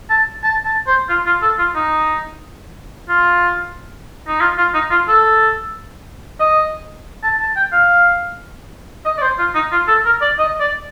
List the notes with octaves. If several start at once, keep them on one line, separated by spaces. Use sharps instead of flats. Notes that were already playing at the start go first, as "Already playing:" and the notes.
A5
A5
A5
C5
F4
F4
A4
F4
D#4
F4
D#4
F4
F4
D#4
F4
A4
D#5
A5
A5
G5
F5
D#5
D5
C5
F4
D#4
F4
A4
A#4
D5
D#5
D5